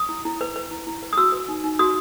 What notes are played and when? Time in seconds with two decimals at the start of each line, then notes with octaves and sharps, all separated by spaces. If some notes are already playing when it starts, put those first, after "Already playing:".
Already playing: D#6
0.09 E4
0.25 E4
0.41 B4
0.56 B4
0.71 E4
0.87 E4
1.03 B4
1.13 D#6
1.17 F#4 E6
1.32 B4
1.48 D#4
1.64 D#4
1.79 F#4 D#6